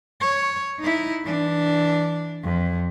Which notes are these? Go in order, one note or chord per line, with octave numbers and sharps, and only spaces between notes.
C#5
D#4 E4
E3 D4
F2